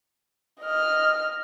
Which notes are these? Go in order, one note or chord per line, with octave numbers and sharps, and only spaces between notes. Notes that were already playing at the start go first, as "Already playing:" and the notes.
D#5 F6